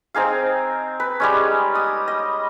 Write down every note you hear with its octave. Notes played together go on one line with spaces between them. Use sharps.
C4 D#4 G#4 F5
B4
G3 G#3 C#4
D#6
D#5